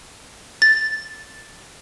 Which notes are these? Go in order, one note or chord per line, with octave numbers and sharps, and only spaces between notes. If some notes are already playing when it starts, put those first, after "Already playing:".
A6